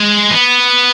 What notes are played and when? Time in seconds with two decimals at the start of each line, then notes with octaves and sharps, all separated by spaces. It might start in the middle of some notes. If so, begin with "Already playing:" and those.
Already playing: G#3
0.30 B3